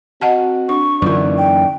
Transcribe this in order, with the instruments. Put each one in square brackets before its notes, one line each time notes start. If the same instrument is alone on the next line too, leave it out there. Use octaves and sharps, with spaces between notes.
[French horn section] C4 F#4 [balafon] D#5 F#5 A5
[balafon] D4 [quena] C#6
[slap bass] F#2 E3 [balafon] D3 F4 A#4 [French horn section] A#3 D#4 D5
[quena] G5